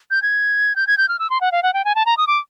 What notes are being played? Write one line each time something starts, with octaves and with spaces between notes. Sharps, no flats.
G6
G#6
G6
G#6
G6
F6
E6
C6
F#5
F5
F#5
G5
G#5
A5
A#5
D#6
D6